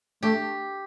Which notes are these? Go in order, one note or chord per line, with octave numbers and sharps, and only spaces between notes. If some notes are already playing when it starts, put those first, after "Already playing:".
A3 G4